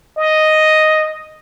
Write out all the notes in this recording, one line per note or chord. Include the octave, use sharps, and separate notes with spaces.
D#5